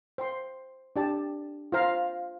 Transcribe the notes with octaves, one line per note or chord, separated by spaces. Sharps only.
C5 G5 C6
D4 G4 D5 A5
F4 C5 F5 A#5